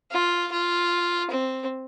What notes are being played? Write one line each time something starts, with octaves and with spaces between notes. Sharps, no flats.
F4
F4
C4